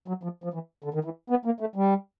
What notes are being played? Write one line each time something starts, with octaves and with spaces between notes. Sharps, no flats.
F#3
F3
F3
E3
D3
D#3
E3
B3
A#3
A3
G3